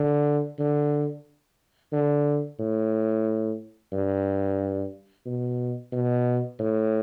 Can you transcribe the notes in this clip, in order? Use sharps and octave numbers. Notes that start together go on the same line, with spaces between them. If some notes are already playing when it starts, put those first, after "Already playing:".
Already playing: D3
D3
D3
A2
G2
B2
B2
A2